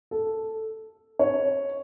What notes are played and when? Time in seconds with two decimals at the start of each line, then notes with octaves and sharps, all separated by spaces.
0.11 A4
1.19 C#5